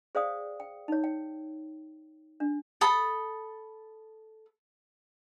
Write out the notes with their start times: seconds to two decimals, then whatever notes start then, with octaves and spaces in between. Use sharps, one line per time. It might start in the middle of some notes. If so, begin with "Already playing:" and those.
0.15 G#4 C5 D5 F5 G5 D#6
0.60 G5
0.88 D#4 C#5
1.04 G5
2.40 D4
2.81 A4 A5 B5 D#6